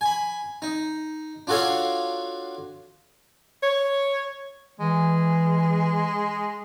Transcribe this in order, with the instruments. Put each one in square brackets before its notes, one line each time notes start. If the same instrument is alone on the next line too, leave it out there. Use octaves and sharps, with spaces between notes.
[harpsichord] G#5 B5
D#4
D4 F4 F#4 A4 C#5 F5
[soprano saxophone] C#5
[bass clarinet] E3 [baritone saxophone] G#3